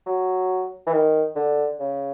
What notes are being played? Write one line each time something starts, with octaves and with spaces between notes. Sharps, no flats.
F#3
E3
D#3
D3
C#3